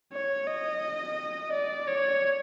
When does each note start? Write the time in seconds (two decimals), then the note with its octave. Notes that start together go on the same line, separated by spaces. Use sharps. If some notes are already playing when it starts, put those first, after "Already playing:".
0.13 C#5
0.47 D#5
1.52 D5
1.87 C#5